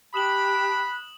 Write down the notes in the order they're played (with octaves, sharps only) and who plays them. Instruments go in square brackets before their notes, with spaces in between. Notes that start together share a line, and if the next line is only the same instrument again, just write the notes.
[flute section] G4 A5 [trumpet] B5 [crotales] D#6 E7 F#7 [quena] F#6